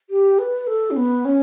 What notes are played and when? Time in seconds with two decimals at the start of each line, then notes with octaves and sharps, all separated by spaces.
0.10 G4
0.39 B4
0.67 A4
0.91 C#4
0.96 B3
1.25 C#4